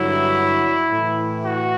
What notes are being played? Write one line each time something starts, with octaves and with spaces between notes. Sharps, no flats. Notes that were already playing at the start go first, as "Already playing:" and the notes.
Already playing: G2 D3 F#3 E4
A2 E3
F#4